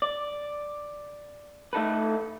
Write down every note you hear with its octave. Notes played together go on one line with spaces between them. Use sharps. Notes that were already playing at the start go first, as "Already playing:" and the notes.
D5
A3 D#4 A4 B4